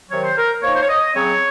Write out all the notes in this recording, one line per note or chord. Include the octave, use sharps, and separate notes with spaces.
C3 D#3 F#3 C#5
C5
A#4
F3 A#3 D#4 C#5
C5
C#5
D#5
C#3 F#3 C4 C#5